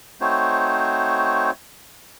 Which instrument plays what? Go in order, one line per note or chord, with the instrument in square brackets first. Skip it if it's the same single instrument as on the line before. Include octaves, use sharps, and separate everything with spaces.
[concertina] A3 C4 D#4 F#4 C5 C#5